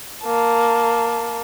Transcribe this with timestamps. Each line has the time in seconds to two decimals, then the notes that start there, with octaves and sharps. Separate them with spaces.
0.25 A#3 A5